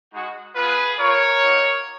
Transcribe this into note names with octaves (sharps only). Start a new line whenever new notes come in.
G#3 D#4 F#4
B3 F4 G#4 B4
A#3 F4 A#4 C#5
A#3 D#4 F#4